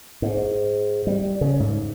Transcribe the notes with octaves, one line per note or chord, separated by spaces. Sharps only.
G#2
G3
C#3
G#2